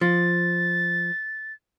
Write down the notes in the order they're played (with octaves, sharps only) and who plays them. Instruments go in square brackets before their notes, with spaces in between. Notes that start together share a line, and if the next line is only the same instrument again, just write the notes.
[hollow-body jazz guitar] F3 [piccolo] A6